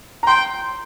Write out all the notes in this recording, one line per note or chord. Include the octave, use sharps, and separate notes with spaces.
A#5
G5 C6